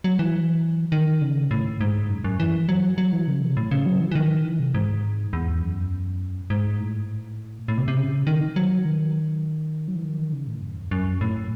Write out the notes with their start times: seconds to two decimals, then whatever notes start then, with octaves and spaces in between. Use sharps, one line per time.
0.04 F#3
0.19 E3
0.92 D#3
1.21 C#3
1.51 A2
1.81 G#2
2.10 F#2
2.24 F#2
2.40 E3
2.69 F#3
2.98 F#3
3.13 E3
3.27 C#3
3.42 C3
3.57 A2
3.71 C#3
3.86 F#3
4.01 E3
4.11 E3
4.15 D#3
4.45 E3
4.59 C3
4.74 G#2
5.33 E2
5.62 F#2
6.50 G#2
6.80 A2
7.68 A2
7.78 C3
7.88 C3
7.97 C#3
8.27 D#3
8.56 F#3
8.85 D#3
9.88 F#3
9.95 E3
10.03 D#3
10.32 C#3
10.47 A2
10.62 F#2
10.76 E2
10.91 F#2
11.21 A2